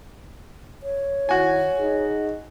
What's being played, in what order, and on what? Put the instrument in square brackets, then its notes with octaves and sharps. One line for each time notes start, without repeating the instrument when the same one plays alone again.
[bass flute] C#5
[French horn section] D#3 E4 [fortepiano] F#4 G#5
[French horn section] D#4 G#4